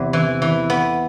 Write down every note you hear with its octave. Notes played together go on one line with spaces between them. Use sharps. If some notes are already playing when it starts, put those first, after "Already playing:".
Already playing: E2 C3
E3
E3
B3